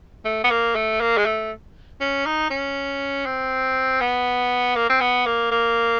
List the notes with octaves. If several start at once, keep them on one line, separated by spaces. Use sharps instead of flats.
A3
B3
A#3
A3
A#3
G#3
A3
C#4
D#4
C#4
C4
B3
A#3
C4
B3
A#3
A#3